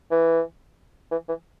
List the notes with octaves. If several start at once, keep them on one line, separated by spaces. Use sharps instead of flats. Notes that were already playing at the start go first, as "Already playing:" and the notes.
E3
E3
E3